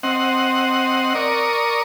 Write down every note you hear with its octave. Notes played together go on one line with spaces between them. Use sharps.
C4 D#5 F#5
A#4 D5 C#6 D#6